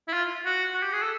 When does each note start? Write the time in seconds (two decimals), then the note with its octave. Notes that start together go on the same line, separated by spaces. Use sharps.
0.08 E4
0.13 F4
0.45 F#4
0.74 F#4
0.83 G4
0.92 G#4
1.02 A4